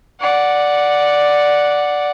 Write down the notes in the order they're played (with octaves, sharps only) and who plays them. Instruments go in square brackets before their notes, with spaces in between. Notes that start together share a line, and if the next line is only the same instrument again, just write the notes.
[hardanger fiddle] D5 F#5